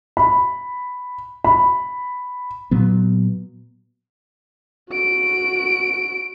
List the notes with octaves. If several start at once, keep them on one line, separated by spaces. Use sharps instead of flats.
B5
B5
A#2 F#3 B3
F#4 D7